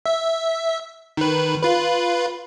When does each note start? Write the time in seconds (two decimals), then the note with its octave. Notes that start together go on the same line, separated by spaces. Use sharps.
0.06 E5
1.17 D#3 B4
1.63 F4 B4